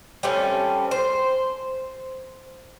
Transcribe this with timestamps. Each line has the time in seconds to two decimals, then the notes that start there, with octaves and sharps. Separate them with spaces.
0.23 G3 A3 C4 C#4
0.91 C5